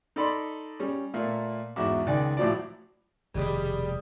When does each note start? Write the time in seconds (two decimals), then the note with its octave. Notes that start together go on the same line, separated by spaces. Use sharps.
0.16 D#4 A4 D5 B5 C6
0.80 G3 C#4
1.14 A#2 A3 A#3
1.76 E2 G#2 F#4 E5 D6
2.06 C#2 D#3 D5 G#5
2.37 A2 F3 F#3 D5
3.35 F1 D2 B2 D#3 G3 G#4 D#6